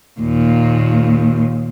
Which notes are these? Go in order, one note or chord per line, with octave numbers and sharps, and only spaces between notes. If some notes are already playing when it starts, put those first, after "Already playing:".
D#2 A#2